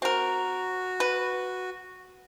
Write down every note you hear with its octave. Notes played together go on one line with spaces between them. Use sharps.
C4 F#4 A#4
B4